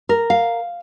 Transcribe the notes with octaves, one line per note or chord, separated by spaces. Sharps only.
A#4
F5